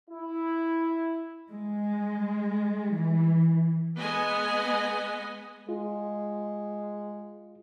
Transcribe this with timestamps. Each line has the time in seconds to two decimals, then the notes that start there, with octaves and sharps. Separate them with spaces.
0.10 E4
1.52 G#3
2.95 E3
3.97 G#3 B3 D#5 G#5
5.69 G#3 F4